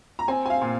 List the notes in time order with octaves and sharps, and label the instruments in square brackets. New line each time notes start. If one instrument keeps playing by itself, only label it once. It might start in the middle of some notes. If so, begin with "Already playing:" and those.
[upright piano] A#5
[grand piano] C4 [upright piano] G#5
[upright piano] G#5
F5
[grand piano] A#2